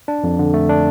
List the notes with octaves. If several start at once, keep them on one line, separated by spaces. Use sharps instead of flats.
D4
F2
D3
A3
D4